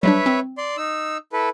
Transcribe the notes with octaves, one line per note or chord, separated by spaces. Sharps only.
F#3 G3 D4 B4 C#5 E5
C4
D5 C6
D#4 E6
E4 A4 B4